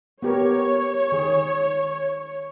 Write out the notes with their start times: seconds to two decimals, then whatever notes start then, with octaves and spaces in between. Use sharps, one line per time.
0.22 B3 G4 A#4 C#5
1.12 D#3 G#4